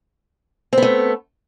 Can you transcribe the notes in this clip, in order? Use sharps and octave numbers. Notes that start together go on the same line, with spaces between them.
A3 B3 C4